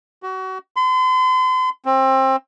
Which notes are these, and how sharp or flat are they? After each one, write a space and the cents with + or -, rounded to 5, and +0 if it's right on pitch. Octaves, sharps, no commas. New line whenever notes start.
F#4 +30
C6 -40
C4 +25